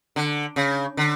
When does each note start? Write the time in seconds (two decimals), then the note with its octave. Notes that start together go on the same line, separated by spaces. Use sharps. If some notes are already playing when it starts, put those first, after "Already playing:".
0.16 D3
0.56 C#3
0.97 D3